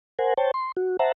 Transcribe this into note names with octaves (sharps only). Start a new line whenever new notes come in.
A#4 C5 F#5 G#5
C5 C#5 G5 A5
C6
F#4
C5 E5 F#5 A5 A#5